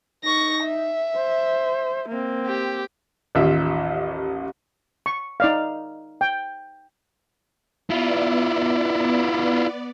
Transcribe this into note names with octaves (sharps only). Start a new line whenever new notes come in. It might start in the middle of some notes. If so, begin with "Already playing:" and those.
D#4 C#6 A#6
E5
C5
A#3 C4
G4
A1 D#2 F4 E5
C#6
D#4 D5 F5
G5
B3 E4 F4 D5